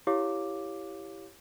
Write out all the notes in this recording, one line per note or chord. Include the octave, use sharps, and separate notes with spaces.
E4 G4 C#5 F5 D6